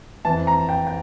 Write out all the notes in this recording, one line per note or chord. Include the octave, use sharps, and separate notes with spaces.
F2 E3 A5
A#5
G5
G5